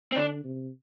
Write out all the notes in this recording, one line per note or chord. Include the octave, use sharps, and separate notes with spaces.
C4
D3 D4
C3